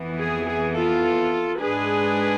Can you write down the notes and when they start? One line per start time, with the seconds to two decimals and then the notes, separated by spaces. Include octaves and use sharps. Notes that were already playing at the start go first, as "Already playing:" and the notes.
Already playing: F2 E3 B3
0.19 G#4
0.46 G#4
0.75 F4 A4
1.59 G#2 G#3 D4 G#4 B4